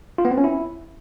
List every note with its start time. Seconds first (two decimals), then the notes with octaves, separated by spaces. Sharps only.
0.18 F4
0.25 B3
0.31 C4
0.38 C#4
0.44 E4